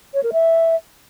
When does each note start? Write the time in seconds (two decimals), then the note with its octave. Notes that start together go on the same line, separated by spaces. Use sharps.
0.14 C#5
0.23 A#4
0.33 E5